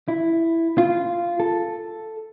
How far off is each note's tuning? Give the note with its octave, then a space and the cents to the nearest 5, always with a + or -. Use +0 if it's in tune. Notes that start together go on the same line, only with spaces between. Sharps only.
E4 +5
F4 -10
A4 +0